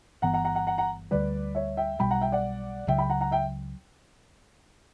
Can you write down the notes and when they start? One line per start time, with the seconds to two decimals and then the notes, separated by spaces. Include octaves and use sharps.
0.22 G1 G2 E3 B3 F#5 A#5
0.33 F#5 A#5
0.44 F#5 A#5
0.55 F#5 A#5
0.67 F#5 A#5
0.78 F#5 A#5
1.11 D2 D3 G3 B4 D5
1.55 C#5 E5
1.77 E5 G5
1.99 B1 B2 G3 G5 B5
2.11 F#5 A#5
2.21 E5 G5
2.32 D5 F#5
2.87 C#2 C#3 F#3 E5 G5
2.98 G5 B5
3.10 F#5 A#5
3.21 F#5 A#5
3.31 E5 G5